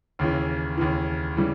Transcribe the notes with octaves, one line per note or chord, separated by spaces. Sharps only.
D#2 C#3 E3
D#2 C#3 E3
C#3 E3 G3